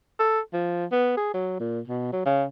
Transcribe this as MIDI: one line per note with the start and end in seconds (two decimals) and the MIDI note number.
0.19 0.40 69
0.53 0.85 53
0.92 1.13 59
1.17 1.34 68
1.34 1.57 54
1.60 1.80 46
1.88 2.08 47
2.13 2.24 54
2.25 2.44 49